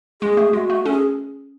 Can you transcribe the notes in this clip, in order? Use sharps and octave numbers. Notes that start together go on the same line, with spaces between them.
G#3 G#4
A3
G#3 F#4
A3
C#4 A4
G#4